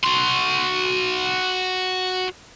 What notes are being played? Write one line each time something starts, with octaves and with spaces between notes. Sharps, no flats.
F#4 C6